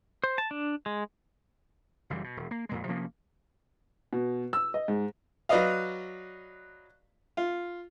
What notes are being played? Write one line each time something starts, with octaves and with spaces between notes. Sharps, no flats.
C5
A5
D4
G#3
F#1 F#2 E3 G3
B2
E1
A#3
F2 A#2 G#3
C3 F3 A#3 C#4
B2
E6
D#5
G#2
F#3 B4 D5 D#5 F5
F4